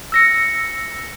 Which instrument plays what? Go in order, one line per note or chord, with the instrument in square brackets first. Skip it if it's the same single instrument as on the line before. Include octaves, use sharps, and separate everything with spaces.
[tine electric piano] E6 A#6 C#7